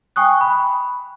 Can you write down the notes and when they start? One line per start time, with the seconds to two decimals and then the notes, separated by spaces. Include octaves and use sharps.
0.16 G5 G#5 C#6 D#6 F#6
0.41 B5